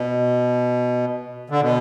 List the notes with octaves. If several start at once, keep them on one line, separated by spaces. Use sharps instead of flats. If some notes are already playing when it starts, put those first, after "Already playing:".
Already playing: B2
D3
B2